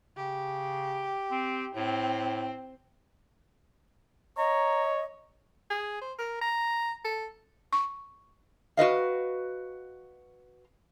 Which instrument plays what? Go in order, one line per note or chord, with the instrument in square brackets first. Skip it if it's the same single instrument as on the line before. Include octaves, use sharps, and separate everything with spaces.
[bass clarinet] C#3 [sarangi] G4
[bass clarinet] C4
[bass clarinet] A2 [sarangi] C4
[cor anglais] C#5 [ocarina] D#5 [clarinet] A#5
[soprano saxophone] G#4
C5
A#4
A#5
A4
[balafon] C#6
[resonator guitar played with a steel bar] F#4 B4 D#5 F5